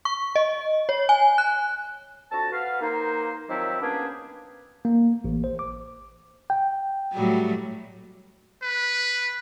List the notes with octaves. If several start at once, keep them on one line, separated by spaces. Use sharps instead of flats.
C#6
D#5
C#5
G#5
F#6
F2 D3 F#4 A5
F#4 B4 F5
A#3 D#4 C5
D#3 F3 F#3 C4 E4 G4
A#3 B3 C#4 D4 G4 G#4
A#3
A1
C5
D6
G5
A2 F#3 G3
B4